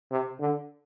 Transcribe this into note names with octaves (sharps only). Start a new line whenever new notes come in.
C3
D3